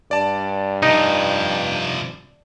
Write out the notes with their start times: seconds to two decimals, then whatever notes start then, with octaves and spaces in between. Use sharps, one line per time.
0.11 G2 D5 A5
0.83 C3 F3 D#4